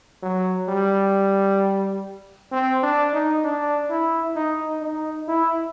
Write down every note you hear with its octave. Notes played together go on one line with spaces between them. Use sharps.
F#3
G3
C4
D4
D#4
D4
E4
D#4
D#4
E4